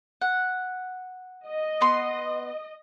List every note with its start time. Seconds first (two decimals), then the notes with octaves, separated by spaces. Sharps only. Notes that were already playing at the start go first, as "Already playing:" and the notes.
0.22 F#5
1.48 D#5
1.81 B3 C6